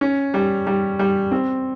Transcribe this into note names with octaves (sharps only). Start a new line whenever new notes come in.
C#4
G3
G3
G3
C4